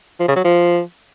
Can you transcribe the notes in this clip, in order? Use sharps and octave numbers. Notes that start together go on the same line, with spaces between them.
F3
C#3
F#3
F3